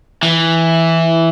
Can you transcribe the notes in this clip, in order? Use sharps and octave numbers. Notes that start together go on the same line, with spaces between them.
E3